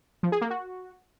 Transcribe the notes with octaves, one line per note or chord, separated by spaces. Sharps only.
F3
G#4
A#3
F#4